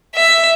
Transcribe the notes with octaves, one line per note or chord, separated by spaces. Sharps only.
E5